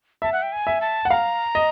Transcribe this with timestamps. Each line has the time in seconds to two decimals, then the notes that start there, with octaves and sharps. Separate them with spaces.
0.22 E5 A5
0.32 F#5
0.42 G5
0.52 G#5
0.67 E5
0.81 A5
1.05 F#5
1.10 F5 A#5
1.55 D#5